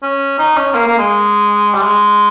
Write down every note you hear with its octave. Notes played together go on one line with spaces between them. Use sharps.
C#4
D#4
C#4
A#3
A#3
G#3
G3
G#3